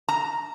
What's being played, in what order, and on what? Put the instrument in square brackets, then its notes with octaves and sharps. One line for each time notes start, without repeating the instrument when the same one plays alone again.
[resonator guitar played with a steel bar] A#5